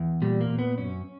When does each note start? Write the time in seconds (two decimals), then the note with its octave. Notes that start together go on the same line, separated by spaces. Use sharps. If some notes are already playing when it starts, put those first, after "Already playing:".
Already playing: E2
0.22 A#2 G3
0.41 A#3
0.50 A#2
0.59 B3
0.78 F#2 C#4